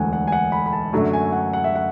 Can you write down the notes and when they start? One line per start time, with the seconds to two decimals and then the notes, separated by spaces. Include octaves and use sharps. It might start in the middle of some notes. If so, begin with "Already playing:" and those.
Already playing: E1 D2 D3 F#5 G#5
0.13 F#5
0.27 G#5
0.32 F#5
0.52 B5
0.66 B5
0.73 A5
0.93 F#2 D3 F#3 A3
1.13 G#5
1.32 F#5
1.53 F#5
1.64 E5
1.75 F#5